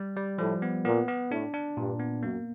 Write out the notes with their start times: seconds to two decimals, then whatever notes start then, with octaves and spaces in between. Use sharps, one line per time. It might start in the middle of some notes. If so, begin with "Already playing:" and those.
Already playing: G3
0.16 G3
0.38 A2 F3
0.62 B3
0.85 A#2 B3
1.08 B3
1.31 A2 D4
1.54 D4
1.77 G2 A#2
2.00 B3
2.23 F#2 A#3